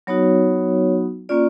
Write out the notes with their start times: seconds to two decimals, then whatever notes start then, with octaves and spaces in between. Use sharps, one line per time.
0.07 F#3 B3 D#4 F#4 C#5
1.29 A#3 C#4 F4 D5